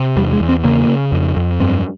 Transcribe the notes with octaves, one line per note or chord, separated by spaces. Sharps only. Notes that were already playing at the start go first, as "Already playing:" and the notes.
Already playing: C3
E2 G3
G#3
E2
C4
C#3 A#3
C#3
F2
F2
G2 C4